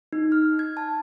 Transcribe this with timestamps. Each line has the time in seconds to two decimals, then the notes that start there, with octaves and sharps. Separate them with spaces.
0.13 D#4
0.32 F6
0.59 G#6
0.77 A5